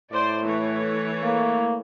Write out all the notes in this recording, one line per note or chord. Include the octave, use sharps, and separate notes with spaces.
A2 C5 D5
E3 A3 C#5
A#3